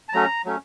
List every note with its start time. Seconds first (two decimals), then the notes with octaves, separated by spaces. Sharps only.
0.09 A5
0.13 F#3 A3 C#4 A#5
0.45 F#3 A3 C#4